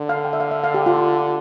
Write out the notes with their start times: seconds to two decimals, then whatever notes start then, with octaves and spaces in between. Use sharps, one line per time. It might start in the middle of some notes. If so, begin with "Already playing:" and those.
Already playing: D3
0.09 F5
0.24 G5
0.33 E5
0.40 F5
0.51 E5
0.64 F5
0.74 G4
0.86 F4